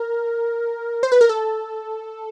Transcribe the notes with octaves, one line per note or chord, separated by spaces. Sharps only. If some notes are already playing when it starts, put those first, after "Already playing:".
Already playing: A#4
C5
B4
A#4
A4